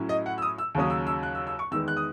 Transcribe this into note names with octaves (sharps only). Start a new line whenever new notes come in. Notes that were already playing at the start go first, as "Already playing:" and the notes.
Already playing: A2 F#3 C#4 E4
D#5
F#5
E6
D#6
E6
D#2 C#3 F#3 C#4 D#6
E6
E6
F#6
E6
E6
C#6
E2 D#3 G#3 B3 E6
F#6
D#6